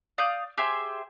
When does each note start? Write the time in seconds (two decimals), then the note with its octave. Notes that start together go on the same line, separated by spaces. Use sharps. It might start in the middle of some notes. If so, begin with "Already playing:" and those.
0.18 D5 F5 D#6 G6
0.58 G4 G#4 C5 E5